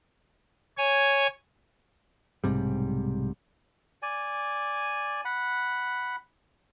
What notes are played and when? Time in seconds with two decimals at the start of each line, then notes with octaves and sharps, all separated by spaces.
0.78 C#5 G#5
2.44 B1 G#2 C3 G3
4.02 D5 G#5
5.25 F#5 B5